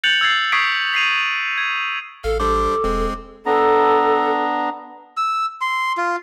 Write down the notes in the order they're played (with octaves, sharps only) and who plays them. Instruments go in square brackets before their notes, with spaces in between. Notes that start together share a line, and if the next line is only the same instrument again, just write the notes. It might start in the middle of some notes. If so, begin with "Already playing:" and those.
[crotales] F#6 G6 A6 C#7 F7 F#7
E6 G#6 A6 C7
C#6 D#6 G#6 B6 C7 D7
B6 C7 D#7 F7
G#6
[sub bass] A1 [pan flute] A4 [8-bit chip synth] F5
[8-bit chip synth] G3 D4 C5 [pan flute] A4 [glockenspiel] D6
[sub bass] E1 [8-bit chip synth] G#3 C4
[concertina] B3 D4 A#5 [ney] A4
[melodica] E6
C6
F4